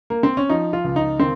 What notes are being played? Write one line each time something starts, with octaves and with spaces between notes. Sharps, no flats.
A#3
C4
C#4
F3 D#4
F4
C#2
D#4
D#3 C4